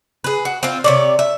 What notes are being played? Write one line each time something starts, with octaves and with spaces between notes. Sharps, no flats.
G#4 B4
F#4
C4 F4
C3 C#5 D5
E5